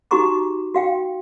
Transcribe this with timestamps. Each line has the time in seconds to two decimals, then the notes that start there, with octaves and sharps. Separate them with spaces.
0.11 D#4 F#4 G4 A#5 C#6 D6
0.74 F#4 F5 G5